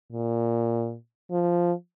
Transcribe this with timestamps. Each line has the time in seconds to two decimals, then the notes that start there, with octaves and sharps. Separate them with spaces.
0.13 A#2
1.31 F3